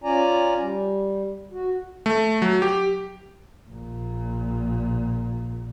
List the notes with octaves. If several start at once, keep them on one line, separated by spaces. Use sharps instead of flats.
C#4 F4 D5 G#5 A#5
G3
F#4
A3
F#3
G4
A#1 A#2